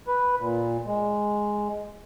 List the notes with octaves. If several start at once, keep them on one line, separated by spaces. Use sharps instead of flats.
B4
A#2
G#3